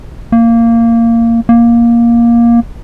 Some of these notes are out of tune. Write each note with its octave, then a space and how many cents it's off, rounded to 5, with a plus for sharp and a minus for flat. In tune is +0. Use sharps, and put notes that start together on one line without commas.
A#3 -15
A#3 +10